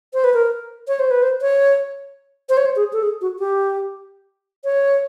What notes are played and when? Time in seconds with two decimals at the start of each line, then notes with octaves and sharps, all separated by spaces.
0.14 C5
0.24 B4
0.34 A#4
0.88 C#5
0.99 C5
1.11 B4
1.23 C5
1.42 C#5
2.49 C5
2.57 C#5
2.65 C5
2.76 G#4
2.93 A4
3.03 G#4
3.21 F#4
3.39 G4
4.64 C#5